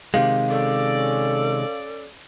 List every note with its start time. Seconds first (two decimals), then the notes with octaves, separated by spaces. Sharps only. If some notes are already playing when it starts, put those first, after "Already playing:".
0.14 C3 D#3 G#3 G4 F5
0.49 C#4 A4 D5